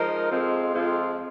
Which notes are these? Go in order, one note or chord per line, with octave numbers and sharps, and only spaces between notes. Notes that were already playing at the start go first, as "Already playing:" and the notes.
Already playing: F3 G#3 D#4 A#4
F2 F3 G#3 C4 F4
F2 F3 G#3 C4 F4